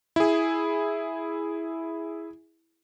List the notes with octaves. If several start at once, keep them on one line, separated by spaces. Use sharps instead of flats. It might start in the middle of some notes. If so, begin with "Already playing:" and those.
E4 G#4